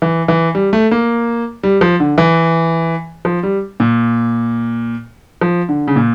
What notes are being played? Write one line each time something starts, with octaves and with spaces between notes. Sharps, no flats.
E3
E3
G3
A3
A#3
G3
F3
D3
E3
F3
G3
A#2
F3
D3
C#3
A#2